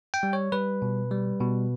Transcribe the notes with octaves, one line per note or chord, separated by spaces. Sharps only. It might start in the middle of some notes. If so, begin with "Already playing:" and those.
G5
G3
C#5
G3 B4
B2
G3
B2